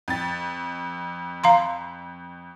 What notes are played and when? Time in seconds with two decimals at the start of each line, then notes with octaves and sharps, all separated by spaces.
0.08 F2 A6
1.44 F5 A#5 C6